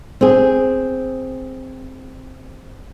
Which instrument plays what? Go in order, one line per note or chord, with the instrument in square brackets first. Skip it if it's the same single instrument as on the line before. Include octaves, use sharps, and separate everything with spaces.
[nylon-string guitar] C4 G#4